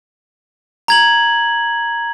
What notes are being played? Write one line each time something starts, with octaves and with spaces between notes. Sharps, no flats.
A#5 G#6 F#7